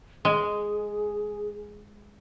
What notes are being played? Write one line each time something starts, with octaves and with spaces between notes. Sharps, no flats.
G#3 G#4